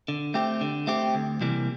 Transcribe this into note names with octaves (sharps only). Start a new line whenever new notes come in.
D3
A3 C4 G4
D3
A3 C4 G4
D2
C3 E3 G3 A#3